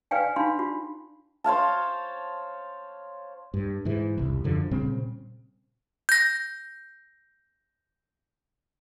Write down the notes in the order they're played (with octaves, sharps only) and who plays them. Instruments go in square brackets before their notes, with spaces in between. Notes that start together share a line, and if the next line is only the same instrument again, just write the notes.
[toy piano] B4 D5 F5 G5 G#5
D4 D#4 F5 B5 C6
F4
[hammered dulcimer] C5 C#5 F5 A5
[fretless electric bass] G2
G#2 E3
E1 C2
F#2 D3 F3
A#2 C#3 G3 C4
[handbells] G6 A#6